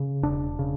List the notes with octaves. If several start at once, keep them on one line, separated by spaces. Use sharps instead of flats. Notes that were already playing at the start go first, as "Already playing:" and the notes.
Already playing: C#3
E1 D4
C#3